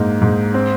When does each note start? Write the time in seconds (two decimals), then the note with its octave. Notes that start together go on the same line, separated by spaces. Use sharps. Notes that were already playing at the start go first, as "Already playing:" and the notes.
Already playing: G#2 A#3 D#4
0.22 G#2
0.54 C4